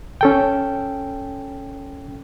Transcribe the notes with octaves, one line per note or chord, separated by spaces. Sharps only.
C#4 A4 G5